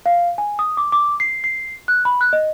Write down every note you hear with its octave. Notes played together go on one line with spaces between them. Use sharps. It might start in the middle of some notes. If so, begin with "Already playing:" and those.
F5
G#5
D#6
D6
D6
C7
C7
F#6
B5
F#6
D#5